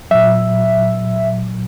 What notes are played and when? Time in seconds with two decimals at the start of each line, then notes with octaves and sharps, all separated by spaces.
0.11 A#2 F#3 E5